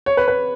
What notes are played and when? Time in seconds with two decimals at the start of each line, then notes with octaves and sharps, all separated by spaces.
0.06 C#5
0.17 B4
0.28 B4